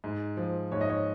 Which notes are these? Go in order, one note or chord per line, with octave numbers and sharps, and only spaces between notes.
G#2
F3
G#2 C#5
D#5
C#5